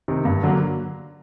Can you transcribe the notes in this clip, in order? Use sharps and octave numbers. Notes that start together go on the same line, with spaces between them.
C3 D#3
G2
D3 F#3 A#3